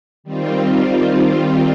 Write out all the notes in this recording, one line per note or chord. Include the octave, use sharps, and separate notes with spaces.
D#3 G3 C4 F4